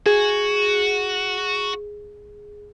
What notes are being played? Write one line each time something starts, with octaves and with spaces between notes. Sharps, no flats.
F#4 G#4